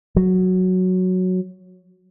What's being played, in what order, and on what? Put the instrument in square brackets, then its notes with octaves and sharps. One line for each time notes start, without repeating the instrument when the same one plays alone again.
[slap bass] F#3